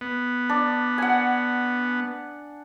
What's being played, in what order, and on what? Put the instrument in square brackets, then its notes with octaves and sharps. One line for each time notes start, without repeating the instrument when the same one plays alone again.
[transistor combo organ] B3
[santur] D4
F#5 G#5